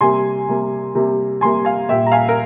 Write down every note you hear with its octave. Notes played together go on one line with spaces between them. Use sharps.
C3 G3 A#3 G#5 C6
C3 G3 A#3
C3 G3 A#3
C3 G3 A#3 G#5 C6
F5 G#5
A#2 G3 A#3 E5 G5
A#5
F5 G#5
A#4